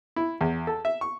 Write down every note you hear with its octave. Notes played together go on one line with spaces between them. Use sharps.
E4
E2
A4
E5
C#6